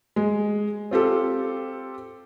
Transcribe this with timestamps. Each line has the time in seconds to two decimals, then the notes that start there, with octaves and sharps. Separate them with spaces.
0.16 G#3
0.91 C4 F4 G4 A4